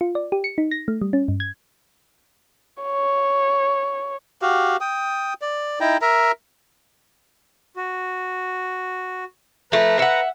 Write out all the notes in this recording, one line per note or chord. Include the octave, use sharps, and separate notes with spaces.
F4
D5
G4
C#7
D#4
A#6
A3
G3
C#4
G2
G#6
C#5
F#4 G4 F5
G5 D#6
D5
D#4 E4 G5 A#5
A#4 E5 A#5
F#4
F3 A3 B4 A#5
E5 F#5